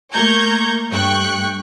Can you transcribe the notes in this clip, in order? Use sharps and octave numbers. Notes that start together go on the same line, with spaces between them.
A3 A#3 A#5 C#6 G6 G#6
G2 A3 G5 C#6 F#6